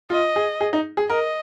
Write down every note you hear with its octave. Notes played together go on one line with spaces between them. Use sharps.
F4 D#5
G#4
G#4
D#4
G#4
A#4 D#5